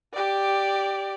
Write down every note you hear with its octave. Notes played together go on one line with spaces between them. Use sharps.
G4 D5